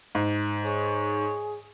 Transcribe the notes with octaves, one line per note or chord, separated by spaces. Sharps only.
G#2
G#4 C#5